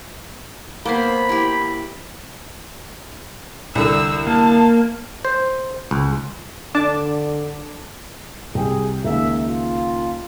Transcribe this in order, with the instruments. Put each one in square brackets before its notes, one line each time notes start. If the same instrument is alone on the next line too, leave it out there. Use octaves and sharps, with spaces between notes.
[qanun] A#3 B3 C5 [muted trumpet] B5
[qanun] E4 G4
[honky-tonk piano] C2 D3 [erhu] E6
[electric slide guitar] A#3 [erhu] A5
[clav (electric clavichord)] C5
C#2
[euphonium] D3 [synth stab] D4 A5 D6
[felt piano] C2 G5 [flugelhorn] G#4
[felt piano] C#2 D#3 A#3 [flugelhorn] E5
[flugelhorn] F4